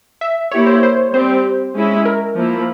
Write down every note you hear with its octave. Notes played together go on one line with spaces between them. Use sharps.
E5
A#3 E4 G4 C#5
C5
C5
G3 C4 G4 C5
G#3 C#4 E4
A#4
F3 A#3 E4